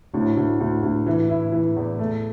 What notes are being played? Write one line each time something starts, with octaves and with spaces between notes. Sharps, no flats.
D2 A2
D2
D2
D2
E3
E4
E3
E2
A3